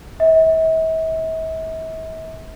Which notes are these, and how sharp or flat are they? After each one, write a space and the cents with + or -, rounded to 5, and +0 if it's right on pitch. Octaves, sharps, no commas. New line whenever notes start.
E5 -40